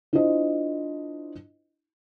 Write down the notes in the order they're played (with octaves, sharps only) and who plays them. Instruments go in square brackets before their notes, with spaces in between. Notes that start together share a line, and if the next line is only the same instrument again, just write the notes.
[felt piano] D4 E4 F4 C5 D#5